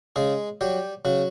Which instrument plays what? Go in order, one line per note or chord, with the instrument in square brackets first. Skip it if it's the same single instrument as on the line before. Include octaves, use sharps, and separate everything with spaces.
[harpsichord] C#3 G#3 G#4
F#3 G3 G4
C#3 F#3 F#4